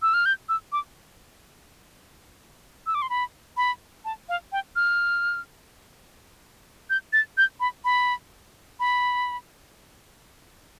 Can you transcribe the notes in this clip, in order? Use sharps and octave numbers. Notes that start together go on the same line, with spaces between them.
E6
F6
G6
E6
D6
E6
D6
C6
B5
B5
A5
F5
G5
F6
G6
A6
G6
B5
B5
B5